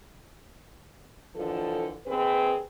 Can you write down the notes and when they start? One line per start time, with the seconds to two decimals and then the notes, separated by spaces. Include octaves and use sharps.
1.36 D#2 D3 E3 F3 A4
2.06 D#2 C4 G#4 B4